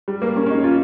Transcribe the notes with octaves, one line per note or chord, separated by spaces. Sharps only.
G3
A#3
C#4
C#4
D#4
F4